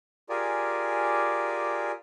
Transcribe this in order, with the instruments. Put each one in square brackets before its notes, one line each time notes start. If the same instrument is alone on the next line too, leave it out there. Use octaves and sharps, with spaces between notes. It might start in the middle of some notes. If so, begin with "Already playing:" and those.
[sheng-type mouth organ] F4 G4 G#4 A#4 D5 G#5